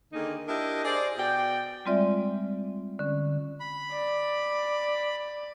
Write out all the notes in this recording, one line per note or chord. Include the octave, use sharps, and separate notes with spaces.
D3 D#3 A#3 D#4 G#4
D4 E4 G4 A#4 D#5
G#4 C5 D5
B2 D5 G5
G3 G#3 C4 F4 D5 E5
D3 C#4
B5
D5